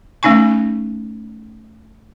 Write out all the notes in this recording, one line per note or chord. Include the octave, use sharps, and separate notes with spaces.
A3 C#4 D#4 G#5 C#6